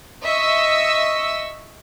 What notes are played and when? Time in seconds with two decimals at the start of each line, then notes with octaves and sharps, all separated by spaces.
0.23 D#5 E5 C#6 E6